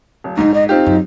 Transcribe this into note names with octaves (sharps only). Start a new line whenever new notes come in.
D1
A#1 G#2 D4 D#4
D#5
C4 D#4 F4 G4
F#2